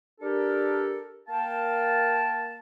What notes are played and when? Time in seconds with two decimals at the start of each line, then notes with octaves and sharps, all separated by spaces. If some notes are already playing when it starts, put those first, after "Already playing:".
0.21 D4 G4 A4 A#4
1.28 A#3 A#4 F5 G5 A5